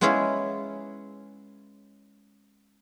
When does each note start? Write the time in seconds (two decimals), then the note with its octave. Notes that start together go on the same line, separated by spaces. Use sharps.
0.01 G#3 B3 C#4 E4 G#4 C#5